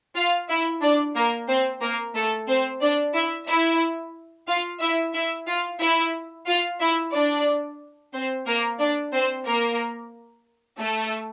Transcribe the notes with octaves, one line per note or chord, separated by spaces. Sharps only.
F4 F5
E4 E5
D4 D5
A#3 A#4
C4 C5
A#3 A#4
A3 A4
C4 C5
D4 D5
E4 E5
E4 E5
F4 F5
E4 E5
E4 E5
F4 F5
E4 E5
F4 F5
E4 E5
D4 D5
C4 C5
A#3 A#4
D4 D5
C4 C5
A#3 A#4
A3 A4